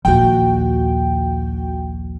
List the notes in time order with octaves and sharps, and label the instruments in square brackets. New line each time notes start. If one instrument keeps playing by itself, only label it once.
[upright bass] A#1 D#2 [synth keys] F#4 G5